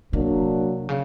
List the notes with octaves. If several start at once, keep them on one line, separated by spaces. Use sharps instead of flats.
C3 F#3 A#3 D4
C#3